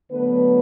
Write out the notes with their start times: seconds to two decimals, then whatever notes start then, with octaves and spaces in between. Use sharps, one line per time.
0.10 D3 F#3 A3 B3 B4